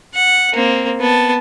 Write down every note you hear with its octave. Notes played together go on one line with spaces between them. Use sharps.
F#5
A#3 C4
B3 A5